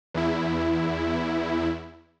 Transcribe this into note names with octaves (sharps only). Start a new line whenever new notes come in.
E2 E4